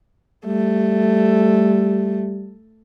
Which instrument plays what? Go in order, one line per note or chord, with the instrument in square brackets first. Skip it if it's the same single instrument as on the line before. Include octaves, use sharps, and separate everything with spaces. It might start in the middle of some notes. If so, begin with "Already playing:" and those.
[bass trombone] G3 [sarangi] A3